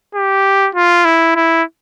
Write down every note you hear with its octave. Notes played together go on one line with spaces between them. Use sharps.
G4
F4
E4
E4